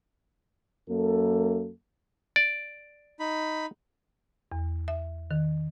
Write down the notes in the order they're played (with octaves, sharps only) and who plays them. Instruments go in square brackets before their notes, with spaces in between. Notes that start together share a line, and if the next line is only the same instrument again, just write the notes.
[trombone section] F#2 A#3 A4
[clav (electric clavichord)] D5
[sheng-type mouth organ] D#4 B5
[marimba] E2
E5
D#3